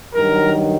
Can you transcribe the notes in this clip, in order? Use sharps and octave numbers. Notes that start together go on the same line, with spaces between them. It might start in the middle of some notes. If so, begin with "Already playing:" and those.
G2 D#3 F#3 A#4